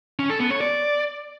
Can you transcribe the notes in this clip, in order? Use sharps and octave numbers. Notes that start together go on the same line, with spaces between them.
C#4
A4
B3
C#5
D5